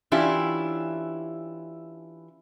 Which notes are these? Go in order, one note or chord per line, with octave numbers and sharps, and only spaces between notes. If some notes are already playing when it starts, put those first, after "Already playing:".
E3 C#4 D4 E4 F4 G4